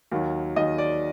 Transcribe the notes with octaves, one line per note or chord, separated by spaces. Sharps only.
D#2 D#3 F#3
D#2 D#3 F#3 D#5
D5